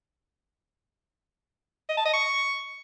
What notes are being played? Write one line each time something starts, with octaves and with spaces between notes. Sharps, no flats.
D#5
A5
D#5
C#6